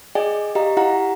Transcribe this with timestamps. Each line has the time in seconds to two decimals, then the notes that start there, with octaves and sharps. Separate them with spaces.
0.15 G#4 D5 D#5 G5 G#5
0.55 G4 D#5 F5 A#5
0.77 E4 G4 F5 F#5 A#5